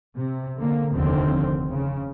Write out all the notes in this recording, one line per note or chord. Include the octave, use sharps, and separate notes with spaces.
C3
D3 A#3
F1 D#2 D3 C4
C#3